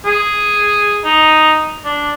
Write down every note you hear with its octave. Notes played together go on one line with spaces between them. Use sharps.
G#4
D#4
D4